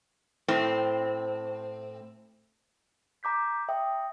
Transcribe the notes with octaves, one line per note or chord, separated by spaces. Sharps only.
A2 C4
A#5 D6 G6 B6
E5 G5 D#6